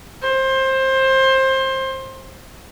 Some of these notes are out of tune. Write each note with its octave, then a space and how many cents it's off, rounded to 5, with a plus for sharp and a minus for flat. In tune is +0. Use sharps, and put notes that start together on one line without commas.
C5 +20